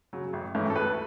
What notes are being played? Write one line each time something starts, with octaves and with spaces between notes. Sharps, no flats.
C#3 F#3
A1
G#2 E3 A3 C#4
A4
D2 B4